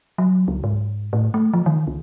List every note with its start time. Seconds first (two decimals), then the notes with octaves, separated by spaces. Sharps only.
0.18 F#3
0.48 C#2
0.64 G#2
1.13 A2
1.34 A3
1.53 F3
1.66 D#3
1.87 C2